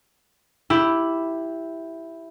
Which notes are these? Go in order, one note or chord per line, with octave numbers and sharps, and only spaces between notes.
E4 G4